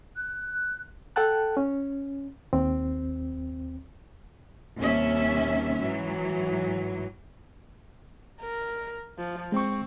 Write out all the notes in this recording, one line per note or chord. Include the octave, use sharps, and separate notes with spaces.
F#6
A4 F#5 G5 A5 F#6
C#4
D#2 C4
D#2 C3 G3 C#4 E5
G#2 E3 F#3
A#4
F3
G#3 C4 C#6